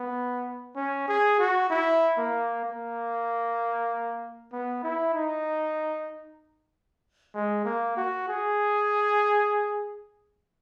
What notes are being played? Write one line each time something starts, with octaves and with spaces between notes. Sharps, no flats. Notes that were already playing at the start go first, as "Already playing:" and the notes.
Already playing: B3
C#4
G#4
F#4
E4
A#3
A#3
B3
E4
D#4
G#3
A#3
F#4
G#4